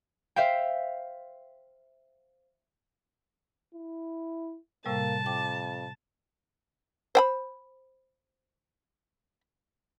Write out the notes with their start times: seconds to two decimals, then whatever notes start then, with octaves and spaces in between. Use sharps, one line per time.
0.36 C5 E5 F5 G5
3.75 E4
4.86 A2 C3 G3 A#3 A5
5.26 F2 G5 D6
7.15 C5 G5 B5